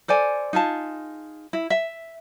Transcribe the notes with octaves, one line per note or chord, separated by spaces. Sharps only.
A4 C5 D5 G#5
D#4 F4 G#4 A5
E4
E5